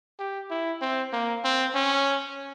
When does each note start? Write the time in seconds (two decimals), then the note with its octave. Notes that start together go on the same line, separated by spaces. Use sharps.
0.19 G4
0.51 E4
0.81 C4
1.13 A#3
1.44 C4
1.75 C#4